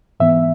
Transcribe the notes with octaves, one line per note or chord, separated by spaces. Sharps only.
G#2 E3 B3 E5